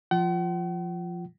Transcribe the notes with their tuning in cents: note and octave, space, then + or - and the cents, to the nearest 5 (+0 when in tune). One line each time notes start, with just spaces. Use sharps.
F3 +0 F4 -5 F#5 +45